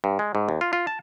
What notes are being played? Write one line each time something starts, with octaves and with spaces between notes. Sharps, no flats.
G2
G#3
G#2
D#2
F4
F4
A5